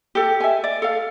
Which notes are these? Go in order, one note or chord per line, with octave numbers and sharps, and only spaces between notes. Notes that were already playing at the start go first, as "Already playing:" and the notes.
G4 A4
E5 G#5
D5
A4 F5